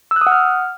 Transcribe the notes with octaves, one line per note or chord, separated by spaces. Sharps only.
E6
F#6
D#6
F#5
F6